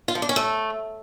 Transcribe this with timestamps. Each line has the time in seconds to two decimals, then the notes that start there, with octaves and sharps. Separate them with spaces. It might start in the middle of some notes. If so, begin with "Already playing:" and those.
0.08 F4
0.15 F3
0.22 D4
0.29 C#4
0.36 A3